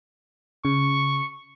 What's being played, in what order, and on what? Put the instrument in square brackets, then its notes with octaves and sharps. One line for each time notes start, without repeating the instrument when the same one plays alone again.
[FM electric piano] C#3 [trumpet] C#6